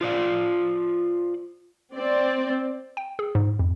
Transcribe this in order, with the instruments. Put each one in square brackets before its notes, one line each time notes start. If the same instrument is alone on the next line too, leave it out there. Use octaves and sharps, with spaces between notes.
[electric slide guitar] F4 C5 D5 F5
[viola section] C4 D5
[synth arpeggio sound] G5
G#4
G#2
F2